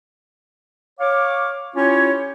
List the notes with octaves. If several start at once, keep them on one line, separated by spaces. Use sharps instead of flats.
C#5 F5 D6
C#4 E4 F4 G4 C#5